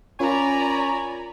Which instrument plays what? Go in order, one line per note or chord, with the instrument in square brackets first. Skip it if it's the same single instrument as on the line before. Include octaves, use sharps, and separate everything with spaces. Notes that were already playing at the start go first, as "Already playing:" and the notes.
[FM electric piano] C#4 F4 A#4 [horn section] C#5 G#5 B5 [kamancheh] D5 A#5